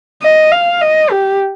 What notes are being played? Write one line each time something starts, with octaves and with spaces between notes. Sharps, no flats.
D#5
F5
D#5
G4